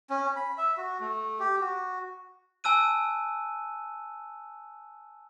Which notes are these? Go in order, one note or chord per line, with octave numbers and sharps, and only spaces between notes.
C#4
B5
E5
F#4
A3
G4
F#4
G#5 A5 E6 F#6 D#7